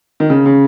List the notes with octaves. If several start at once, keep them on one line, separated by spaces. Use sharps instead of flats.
D#3
C#3
C#3